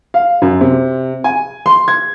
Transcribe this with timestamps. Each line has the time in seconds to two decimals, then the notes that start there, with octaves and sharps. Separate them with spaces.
0.14 F5
0.42 F#2
0.61 C3
1.24 G#5
1.66 C6
1.88 G#6